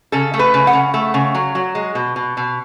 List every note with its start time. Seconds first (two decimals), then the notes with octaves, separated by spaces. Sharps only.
0.12 C#3 A4
0.34 A3
0.39 B4
0.54 C#3
0.67 F#5
0.73 C#3
0.94 A3
1.14 C#3
1.35 F#3
1.55 F#3
1.75 G#3
1.95 B2
2.16 B2
2.37 B2